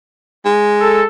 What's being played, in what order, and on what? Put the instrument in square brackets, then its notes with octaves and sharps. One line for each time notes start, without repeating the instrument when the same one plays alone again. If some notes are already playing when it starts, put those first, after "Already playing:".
[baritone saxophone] G#3
[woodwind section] A4